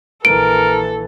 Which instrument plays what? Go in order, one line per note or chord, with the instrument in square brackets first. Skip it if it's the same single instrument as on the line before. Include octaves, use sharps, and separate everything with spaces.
[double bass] A#1 E3 [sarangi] A4 [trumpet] A#4 [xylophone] D7